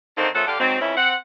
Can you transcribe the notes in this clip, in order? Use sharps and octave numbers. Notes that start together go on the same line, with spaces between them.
D3 D#3 A#3 C4 D#4 C5
A#2 F3 C#4 A4 E5 F#5
D3 G4 F5
G#2 F#3 G#3 C4
F2 E3 C#4 E4
C4 F#5